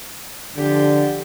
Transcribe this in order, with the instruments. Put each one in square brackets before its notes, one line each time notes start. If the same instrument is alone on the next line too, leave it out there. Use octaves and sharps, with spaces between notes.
[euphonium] D3 [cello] F3 G4